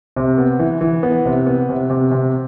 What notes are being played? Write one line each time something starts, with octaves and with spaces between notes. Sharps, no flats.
C3
B3
E3
E3
B3
C3
B3
C3
C3
C3